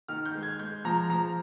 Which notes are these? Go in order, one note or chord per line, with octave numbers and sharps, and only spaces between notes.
D#3 F6
G6
G#3
G#6
G#3 G6
F3 A#5
F3 A#5